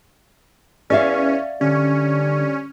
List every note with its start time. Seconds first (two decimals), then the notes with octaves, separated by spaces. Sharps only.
0.90 E2 C#4 D5 E5 F5
1.61 D3 G3 C#4